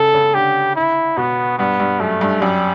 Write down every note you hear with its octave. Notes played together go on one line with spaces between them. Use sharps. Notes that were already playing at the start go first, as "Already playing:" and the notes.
Already playing: C#3 A4
C#3
D3 G4
E4
B2 B3
G2 B3
G2
F#2 A3
G2
F#2 G3